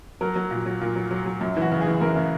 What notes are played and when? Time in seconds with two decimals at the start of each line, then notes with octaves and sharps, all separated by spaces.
0.21 F#3 A#4
0.36 F#3
0.51 A#2
0.66 F#3
0.81 A#2
0.96 F#3
1.11 F#3
1.26 F#3
1.41 F#2
1.57 E3 F#4
1.72 C#3
1.81 G#4
1.86 E3
2.01 F#2 A#4
2.16 C#3